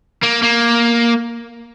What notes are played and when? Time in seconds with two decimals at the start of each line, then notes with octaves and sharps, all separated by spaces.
0.23 A#3
0.43 A#3